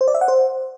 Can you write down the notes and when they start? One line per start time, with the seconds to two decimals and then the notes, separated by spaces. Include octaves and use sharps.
0.01 C5
0.08 D5
0.14 E5
0.21 F#5
0.28 C5